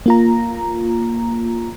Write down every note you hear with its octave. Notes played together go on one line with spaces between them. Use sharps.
A#3 F4 A#5